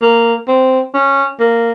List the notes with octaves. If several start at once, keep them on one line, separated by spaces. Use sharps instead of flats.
A#3
C4
C#4
A#3